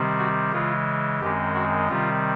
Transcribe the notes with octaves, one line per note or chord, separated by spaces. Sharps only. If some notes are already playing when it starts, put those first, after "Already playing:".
Already playing: C3 D#3 G3 C4
F#4
C#3 E3 G#3 F4
F#2 D#3 G#3 C4 G4
F#4
C3 D#3 G3 C4 F4